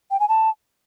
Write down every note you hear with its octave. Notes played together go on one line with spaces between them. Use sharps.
G5
G#5
A5